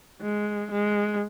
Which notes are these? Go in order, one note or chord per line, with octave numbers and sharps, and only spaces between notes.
G#3
G#3